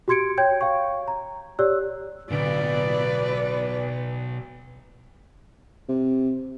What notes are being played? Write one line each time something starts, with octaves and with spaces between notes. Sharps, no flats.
F#4 G4 C6 G#6 C#7 D7
C#5 G5 G6 G#6
C#5 F5 G5 C#6
A#5
G4 C#5 D5 E6 F#6
B1 A2 D3 B4 D5 D7
C3